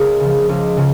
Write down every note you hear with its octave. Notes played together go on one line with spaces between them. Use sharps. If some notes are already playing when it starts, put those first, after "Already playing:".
Already playing: C#2 G#4 A#4 C#5
C#3 F3
C#2
C#3 F3